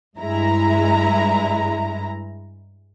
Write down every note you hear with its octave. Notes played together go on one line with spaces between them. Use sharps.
G2 G#3 E4 A#5